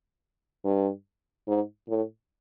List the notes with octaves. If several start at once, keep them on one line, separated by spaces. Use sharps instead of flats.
G2
G#2
A2